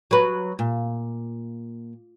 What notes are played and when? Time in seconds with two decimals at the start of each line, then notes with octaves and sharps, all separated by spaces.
0.11 F#3 B4
0.59 A#2